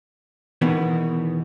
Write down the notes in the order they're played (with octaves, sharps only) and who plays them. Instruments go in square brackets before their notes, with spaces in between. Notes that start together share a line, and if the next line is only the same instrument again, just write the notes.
[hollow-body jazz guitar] E2 B2 D#3 E3 B3